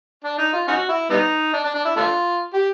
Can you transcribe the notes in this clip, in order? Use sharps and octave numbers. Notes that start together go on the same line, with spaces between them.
D4
D#4
F4
C#4 D#4 F#4
E4
G3 B3 D#4
D4
D4
D4
E4
A3 D4 F4
G4